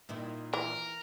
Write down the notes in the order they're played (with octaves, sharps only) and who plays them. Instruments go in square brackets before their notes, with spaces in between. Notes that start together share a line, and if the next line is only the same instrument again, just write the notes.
[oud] A#2 D#3 E4
[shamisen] E3 [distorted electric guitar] A#4